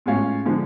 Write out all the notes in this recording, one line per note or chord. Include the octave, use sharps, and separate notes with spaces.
A2 G#3 C#4 F4
D3 F3 G#3